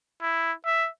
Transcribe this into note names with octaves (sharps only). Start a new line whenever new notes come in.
E4
E5